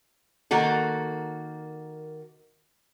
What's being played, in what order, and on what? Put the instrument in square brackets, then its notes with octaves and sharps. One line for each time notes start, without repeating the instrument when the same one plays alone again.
[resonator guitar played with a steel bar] D#3 A#3 F#4 A4